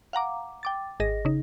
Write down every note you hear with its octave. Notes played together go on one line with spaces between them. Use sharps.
F5 F#5 A#5 D6
G5 D6 A6
G#1 G#4 D#5 A#6
C#3 D#4